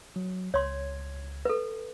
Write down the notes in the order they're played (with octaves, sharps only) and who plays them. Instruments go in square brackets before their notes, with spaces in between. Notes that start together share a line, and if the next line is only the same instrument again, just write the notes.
[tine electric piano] F#3
[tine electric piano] C#2 G#6 [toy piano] C#5 C6
[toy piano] A4 B4